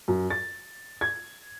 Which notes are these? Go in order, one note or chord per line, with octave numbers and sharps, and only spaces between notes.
F#2
A6
G#6